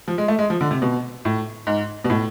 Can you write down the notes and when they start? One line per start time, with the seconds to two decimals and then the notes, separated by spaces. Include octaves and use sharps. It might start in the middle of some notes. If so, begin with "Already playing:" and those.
0.08 F3
0.18 G#3
0.28 A3
0.39 G#3
0.50 F3
0.61 D3
0.71 C3
0.82 B2
1.25 A2
1.67 G#2
2.04 B2
2.10 A2